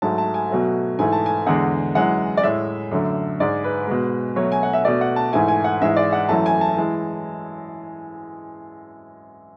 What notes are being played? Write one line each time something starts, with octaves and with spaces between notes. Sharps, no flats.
G#2 F#3 A3 A5
A5
G#5
B2 F#3 A3
G#2 E3 A3 G#5
A5
G#5
E2 D3 G#3 F#5
F#2 E3 G#3 F#5
D5
A2 G#3 E5
F#2 D3 A3
G#2 G#3 D5
B4
B2 G#3
B2 F#3 A3 C#5
G#5
F#5
E5
B2 A3 D5
F#5
A5
G#2 E3 A3 G#5
G#5
F#5
G#2 E3 G#3 E5
D5
F#5
F#2 E3 A3 A5
G#5
A5
E3 G#3